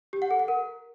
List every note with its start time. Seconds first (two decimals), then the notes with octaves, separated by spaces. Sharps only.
0.13 G4
0.22 F#5
0.31 A4
0.39 F#5
0.48 A#4